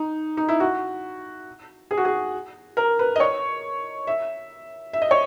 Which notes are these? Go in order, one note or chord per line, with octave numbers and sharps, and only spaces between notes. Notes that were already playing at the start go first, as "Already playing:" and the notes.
Already playing: D#4
D#4
E4
F#4
G#4
F#4
G#4
A#4
B4
D#5
C#5
E5
E5
D#5
C#5